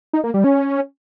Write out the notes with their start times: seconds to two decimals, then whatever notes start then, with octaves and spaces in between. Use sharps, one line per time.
0.13 D#4
0.24 A#3
0.34 G3
0.44 C#4